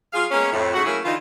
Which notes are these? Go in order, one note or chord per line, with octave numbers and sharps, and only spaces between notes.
F#3 F4 G#4 F5
G#3 A#3 B3 C#4
F2 A2
G#2 C#3 A3 F#4
F#3 A3 A#3 C#4 E4 G#4
D3 E3 D#4 F4